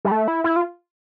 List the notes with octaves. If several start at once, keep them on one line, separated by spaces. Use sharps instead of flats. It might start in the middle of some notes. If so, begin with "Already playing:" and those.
G3
A3
E4
E4
F4